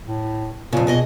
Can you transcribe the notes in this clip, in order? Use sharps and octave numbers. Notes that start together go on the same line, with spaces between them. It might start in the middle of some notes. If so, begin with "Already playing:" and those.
A2
F2 A#2 C#3
B2 G#4 D#5